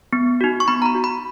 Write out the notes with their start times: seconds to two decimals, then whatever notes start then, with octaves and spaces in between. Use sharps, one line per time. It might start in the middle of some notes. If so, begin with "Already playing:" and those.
0.13 B3
0.41 D#4 F#4
0.60 C#6
0.68 B3 B5
0.82 A#5
0.86 B5
0.95 D#4 F#4
1.04 B5